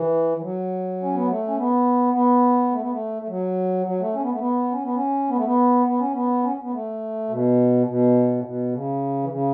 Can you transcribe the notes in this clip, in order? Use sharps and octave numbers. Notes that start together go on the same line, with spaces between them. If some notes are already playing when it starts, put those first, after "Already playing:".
Already playing: E3
E3
F#3
C#4
B3
A3
C#4
B3
B3
A3
B3
A3
A3
F#3
F#3
A3
C#4
B3
A3
B3
C#4
B3
C#4
B3
A3
B3
B3
C#4
B3
C#4
B3
A3
B2
B2
A2
B2
C#3
E3
C#3